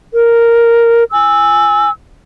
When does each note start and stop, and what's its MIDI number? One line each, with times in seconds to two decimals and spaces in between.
0.13 1.04 70
1.11 1.90 80
1.11 1.90 88